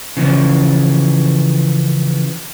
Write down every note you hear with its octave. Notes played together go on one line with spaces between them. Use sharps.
C#3 E3 F3